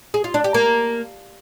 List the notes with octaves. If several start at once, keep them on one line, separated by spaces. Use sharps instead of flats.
G#4
F4
D4
G4
A#3